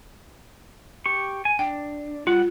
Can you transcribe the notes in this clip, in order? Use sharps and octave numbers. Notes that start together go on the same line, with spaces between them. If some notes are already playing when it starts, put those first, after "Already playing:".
G4 C#6
G#5
D4 G5
G3 F4 F#5